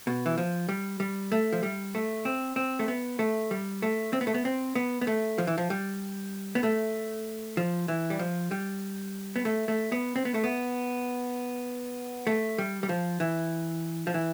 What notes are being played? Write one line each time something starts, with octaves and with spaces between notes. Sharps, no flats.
B2
E3
F3
G3
G3
A3
F3
G3
A3
C4
C4
A3
B3
A3
G3
A3
C4
B3
A3
B3
C4
B3
B3
A3
F3
E3
F3
G3
B3
A3
F3
E3
G3
F3
G3
B3
A3
A3
B3
C4
B3
A3
B3
A3
G3
G3
F3
E3
F3
E3